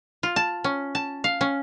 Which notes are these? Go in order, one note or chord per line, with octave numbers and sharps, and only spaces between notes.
F4
A5
C#4
A5
F5
C#4